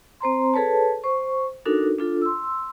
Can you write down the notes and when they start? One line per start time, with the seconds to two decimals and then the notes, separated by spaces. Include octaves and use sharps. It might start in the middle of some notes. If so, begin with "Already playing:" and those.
0.21 C4 C5 A#5 C6
0.54 G#4 A4 B4 C#5 A5
1.04 C5 C#6
1.65 D4 D#4 F#4 A4 A#4
1.99 D4 F4 A4
2.22 C6 E6